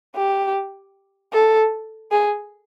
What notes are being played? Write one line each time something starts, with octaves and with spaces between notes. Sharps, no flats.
G4
A4
G#4